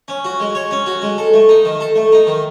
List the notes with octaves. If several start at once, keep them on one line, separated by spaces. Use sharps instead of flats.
C#4
F#4
G#3
C#5
C#4
F#4
G#3
A4
A3
D#4
D#3
A4
A3
D#4
D#3